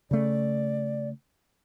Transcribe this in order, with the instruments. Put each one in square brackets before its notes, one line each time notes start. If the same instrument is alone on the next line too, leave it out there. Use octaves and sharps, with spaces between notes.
[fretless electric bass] C#3 A3 [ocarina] D5